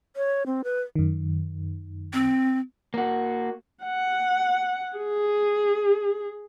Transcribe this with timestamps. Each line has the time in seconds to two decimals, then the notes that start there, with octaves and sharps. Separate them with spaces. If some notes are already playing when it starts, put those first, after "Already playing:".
0.16 C#5
0.46 C4
0.64 B4
0.96 F#2 D#3
2.13 C4
2.94 A#3 F#4
3.85 F#5
4.97 G#4